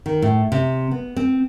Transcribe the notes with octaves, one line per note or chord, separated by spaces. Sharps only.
D#3
A2
C3
B3
C4